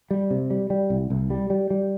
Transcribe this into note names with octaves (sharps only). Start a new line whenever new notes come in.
G3
C3
G3
G3
C2
C2
G3
G3
G3